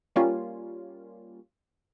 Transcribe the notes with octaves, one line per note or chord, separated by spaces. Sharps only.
G3 A#3 C#4 F4